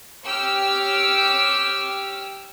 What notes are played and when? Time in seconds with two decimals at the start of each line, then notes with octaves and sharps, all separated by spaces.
0.25 G4 C#5 G5 D6 E6 F6